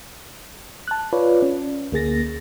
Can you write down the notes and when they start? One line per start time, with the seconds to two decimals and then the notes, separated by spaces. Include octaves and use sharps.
0.88 A5 F#6
1.13 F4 B4 C#5 D5
1.42 C#4
1.92 D2 A#3 G#4 A6 A#6